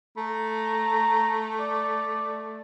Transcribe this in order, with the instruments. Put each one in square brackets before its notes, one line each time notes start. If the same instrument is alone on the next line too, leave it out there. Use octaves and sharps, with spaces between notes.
[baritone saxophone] A3 [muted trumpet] A#5
[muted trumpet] D5